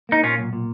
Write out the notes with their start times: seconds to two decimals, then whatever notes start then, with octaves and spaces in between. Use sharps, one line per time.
0.09 A#3 D#4
0.23 A#2 C#4 F4
0.39 B1
0.53 A#2